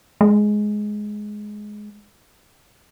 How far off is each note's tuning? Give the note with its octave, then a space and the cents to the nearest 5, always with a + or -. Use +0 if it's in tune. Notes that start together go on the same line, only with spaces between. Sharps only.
G#3 +10